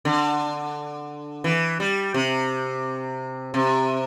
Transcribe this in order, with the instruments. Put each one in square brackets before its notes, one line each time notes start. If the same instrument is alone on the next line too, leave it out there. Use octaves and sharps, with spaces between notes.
[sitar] D3
E3
G3
C3
C3